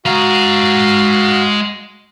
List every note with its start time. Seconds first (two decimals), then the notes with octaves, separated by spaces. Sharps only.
0.06 G#3 F#4 F5 A#5